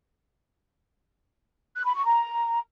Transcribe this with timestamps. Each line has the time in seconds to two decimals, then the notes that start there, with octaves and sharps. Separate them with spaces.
1.76 F#6
1.85 B5
1.95 C#6
2.04 A#5